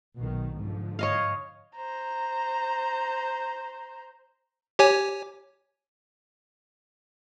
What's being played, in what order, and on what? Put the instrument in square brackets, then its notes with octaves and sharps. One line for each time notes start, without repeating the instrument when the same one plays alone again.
[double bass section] B1 B2 D#3
G#2 D3 F3
[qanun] C#5 D#5 F5
[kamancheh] C5 A#5
[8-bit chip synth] G4 C#5 G#5